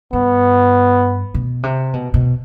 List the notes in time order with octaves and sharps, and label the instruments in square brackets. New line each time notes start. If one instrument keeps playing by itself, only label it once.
[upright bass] G2 [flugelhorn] B3
[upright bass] B2
C3
B2
B2